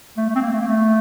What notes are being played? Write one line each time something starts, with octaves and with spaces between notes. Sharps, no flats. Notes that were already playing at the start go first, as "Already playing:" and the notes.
A3
A3
C4
A#3
A3
A#3
A3